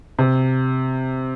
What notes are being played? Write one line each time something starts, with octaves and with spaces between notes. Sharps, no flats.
C3